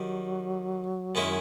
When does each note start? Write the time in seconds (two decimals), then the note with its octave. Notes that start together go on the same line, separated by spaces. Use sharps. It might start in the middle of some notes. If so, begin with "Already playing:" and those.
Already playing: D#3 F#3 G3
1.15 F#2 D#3 G#3 C#4 E4